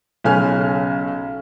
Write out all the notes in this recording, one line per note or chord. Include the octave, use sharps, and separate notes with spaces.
B1 C#3 C#4 G#5 F6